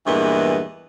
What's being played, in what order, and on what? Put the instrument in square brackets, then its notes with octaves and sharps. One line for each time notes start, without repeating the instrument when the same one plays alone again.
[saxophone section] E2 G2 A#2 E3 G#3 B3